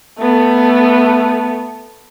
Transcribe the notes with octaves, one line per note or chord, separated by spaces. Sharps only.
A3 B3